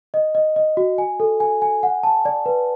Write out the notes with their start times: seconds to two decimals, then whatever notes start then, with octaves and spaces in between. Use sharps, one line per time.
0.14 D#5
0.35 D#5
0.56 D#5
0.77 F#4
0.98 G#5
1.20 A4
1.40 G#5
1.62 G#5
1.83 F#5
2.03 A5
2.25 D5
2.46 B4